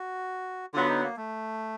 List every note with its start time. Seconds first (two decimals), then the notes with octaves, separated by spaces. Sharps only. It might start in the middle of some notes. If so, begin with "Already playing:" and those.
Already playing: F#4
0.74 D3 F#3 B3 F4
0.88 D#4
1.03 A#3
1.17 A3